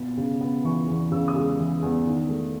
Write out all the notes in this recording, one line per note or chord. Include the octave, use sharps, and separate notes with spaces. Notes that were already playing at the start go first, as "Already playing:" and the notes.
Already playing: B2 A6
C#3
B3
E3 C#6
E2
C#3 E6
D#6
G#3
E3
E2
D#3
A3